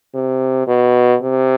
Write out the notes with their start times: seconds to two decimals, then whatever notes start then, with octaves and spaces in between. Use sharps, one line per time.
0.14 C3
0.67 B2
1.22 C3